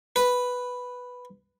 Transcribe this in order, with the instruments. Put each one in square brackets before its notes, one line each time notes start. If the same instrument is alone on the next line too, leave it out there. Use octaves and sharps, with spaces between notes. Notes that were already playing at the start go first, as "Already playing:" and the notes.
[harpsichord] B4